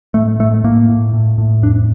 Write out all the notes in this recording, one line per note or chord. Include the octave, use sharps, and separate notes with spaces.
A2 A3
A2 A3
A2 A#3
A2
A2
A2
F2 D4